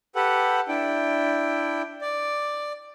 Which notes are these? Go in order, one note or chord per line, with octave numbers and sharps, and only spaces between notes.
G4 A4 B4 F#5
D4 E4 G5
D5